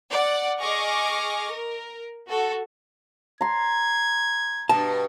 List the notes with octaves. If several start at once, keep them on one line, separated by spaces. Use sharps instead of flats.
D5 F#5
G#4 D#5 C#6 D6 F6 A#6
A#4
F#4 A4
A#5 C6 G#6
G2 B2 A5